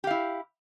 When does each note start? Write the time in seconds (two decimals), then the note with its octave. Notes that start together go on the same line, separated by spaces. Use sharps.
0.04 G4
0.07 F5
0.11 E4